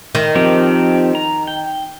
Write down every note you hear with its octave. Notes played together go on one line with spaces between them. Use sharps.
D#3
F3 C4 G4
A#5
G5